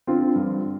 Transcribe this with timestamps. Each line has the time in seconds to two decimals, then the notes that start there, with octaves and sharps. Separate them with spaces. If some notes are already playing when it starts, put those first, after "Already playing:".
0.07 D3 C4 F4
0.36 G2